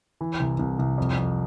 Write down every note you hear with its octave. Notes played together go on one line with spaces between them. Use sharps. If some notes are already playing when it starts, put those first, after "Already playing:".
E3
C2
C2
C2
F2
F2